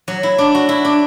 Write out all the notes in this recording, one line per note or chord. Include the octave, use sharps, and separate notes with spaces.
F#3
E4
D4
F#4
E4
D4